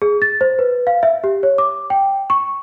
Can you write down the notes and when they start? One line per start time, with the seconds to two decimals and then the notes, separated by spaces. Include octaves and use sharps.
0.02 G#4
0.22 A6
0.41 C5
0.59 B4
0.87 F5
1.03 E5
1.24 G4
1.43 C#5
1.58 D6
1.90 G5
2.30 C#6